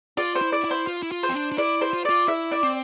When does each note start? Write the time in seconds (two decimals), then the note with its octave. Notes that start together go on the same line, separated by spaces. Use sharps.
0.17 F4 D5
0.35 C5
0.42 E4
0.52 D5
0.64 E4
0.71 C5
0.87 F4
1.03 E4
1.11 F4
1.23 C5
1.29 C4
1.34 D4
1.52 D4
1.58 E4 D5
1.81 C5
1.93 F4
2.05 F4 D5
2.28 E4 E5
2.51 D5
2.63 C4